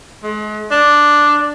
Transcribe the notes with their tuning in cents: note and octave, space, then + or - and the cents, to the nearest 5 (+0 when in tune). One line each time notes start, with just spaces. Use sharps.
G#3 +40
D4 +0